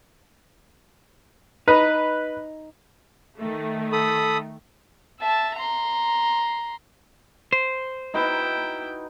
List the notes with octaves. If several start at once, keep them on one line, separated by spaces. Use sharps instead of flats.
D#4 B4
D#3 A3
A4 B5 D#6
E5 A5
A#5 C6
C5
D#4 E4 F#4 B4 G5